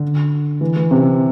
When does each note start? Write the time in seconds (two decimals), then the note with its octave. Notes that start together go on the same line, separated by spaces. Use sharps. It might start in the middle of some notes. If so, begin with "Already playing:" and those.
Already playing: D3
0.61 E3
0.76 E3
0.91 C3